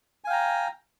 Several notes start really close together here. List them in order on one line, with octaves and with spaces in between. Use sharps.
G#5 F5 G5 A#5